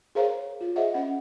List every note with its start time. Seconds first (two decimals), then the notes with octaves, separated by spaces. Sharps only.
0.15 G#4 A#4 C5 C#5 F5 A#5
0.61 F4
0.76 G#4 C5 D#5 E5 F#5
0.94 C#4 F#5